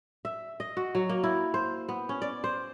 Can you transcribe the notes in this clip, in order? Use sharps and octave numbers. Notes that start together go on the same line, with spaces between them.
E5
D#5
F#4
F#3
A#3
E4
C5
B3
C#4
D5
C5